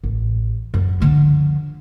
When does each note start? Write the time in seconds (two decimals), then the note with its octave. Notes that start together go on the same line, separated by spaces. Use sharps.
0.04 A1
0.74 F#2
1.00 D3 F3